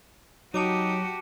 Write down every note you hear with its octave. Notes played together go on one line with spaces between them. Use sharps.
F#3 D#4 F#4 G4 A5 D6 D#7